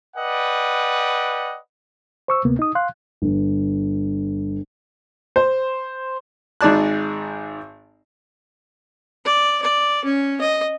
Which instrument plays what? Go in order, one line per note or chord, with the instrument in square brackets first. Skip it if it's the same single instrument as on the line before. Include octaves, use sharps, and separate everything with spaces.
[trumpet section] B4 D5 D#5 F#5 G5
[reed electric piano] C5 C#6 E6
D2 C3 A#3 B3
D#4 D#6
F5 C6 F#6
[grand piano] G1
[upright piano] C5
[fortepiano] G#1 G#2 G#4 D5 A5 F#6
[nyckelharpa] D5
D5
C#4
D#5